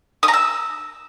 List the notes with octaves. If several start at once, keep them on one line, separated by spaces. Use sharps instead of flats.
D#6
A#5
E6